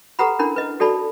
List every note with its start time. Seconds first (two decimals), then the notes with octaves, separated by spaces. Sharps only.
0.19 G4 A4 B4 F#5 A#5 B5
0.39 C#4 D4 E4 A#4 B5
0.56 B4 D#5
0.80 F#4 A4 D5 A5 B5